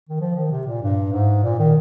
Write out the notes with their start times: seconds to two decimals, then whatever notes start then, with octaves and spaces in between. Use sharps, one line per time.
0.09 D#3
0.20 F3
0.36 D#3
0.51 C3
0.66 A#2
0.83 G2
1.12 G#2
1.43 A#2
1.59 D#3